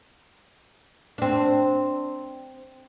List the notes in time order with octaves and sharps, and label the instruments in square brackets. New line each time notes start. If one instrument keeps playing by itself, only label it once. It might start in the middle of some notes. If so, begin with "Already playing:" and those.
[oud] C4 D4